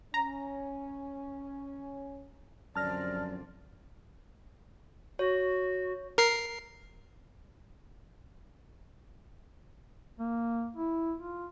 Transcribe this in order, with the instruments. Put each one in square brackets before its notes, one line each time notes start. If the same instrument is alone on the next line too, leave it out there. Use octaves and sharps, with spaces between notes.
[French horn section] C#4 [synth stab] A#5
[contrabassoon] F#2 [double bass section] D3 F3 C4 [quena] D5 [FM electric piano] A5 F6 A#6
[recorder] F#4 [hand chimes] C#5
[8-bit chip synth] A#4 C7
[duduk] A#3
E4
F4